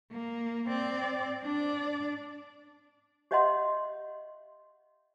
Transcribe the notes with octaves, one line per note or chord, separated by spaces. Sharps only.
A#3
C4 D5
D4 D5
G4 C#5 D#5 E5 F#5 C6